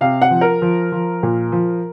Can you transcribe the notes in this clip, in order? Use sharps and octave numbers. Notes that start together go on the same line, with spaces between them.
C3 F5
F#5
F3
A#4
F3
F3
A#2
F3